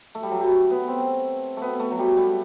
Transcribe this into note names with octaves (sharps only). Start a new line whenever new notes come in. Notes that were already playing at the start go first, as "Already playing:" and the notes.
A3
G3
F#3
G3
A3
B3
C4
A3 B3
A3
F#3
G3
G3